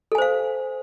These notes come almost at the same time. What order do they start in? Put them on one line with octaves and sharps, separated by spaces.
A4 G#5 C5 F5